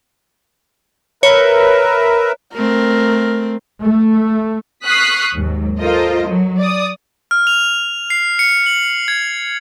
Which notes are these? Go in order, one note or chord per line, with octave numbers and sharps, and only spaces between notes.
A#4 B4 C#5 E5
A3 C4 A#4
A3
C#6 D#6 F6 F#6 B6 C7
D#2 G#2 F#3
F4 A4 A#4 C5 D#5
F#3
D5 D#6
F6
F7
C7
C#7
F#7
G#6